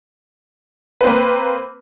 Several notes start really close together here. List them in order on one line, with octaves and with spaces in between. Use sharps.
B4 C4 A#3